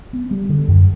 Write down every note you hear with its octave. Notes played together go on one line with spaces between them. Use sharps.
B3
G3
D3
F#2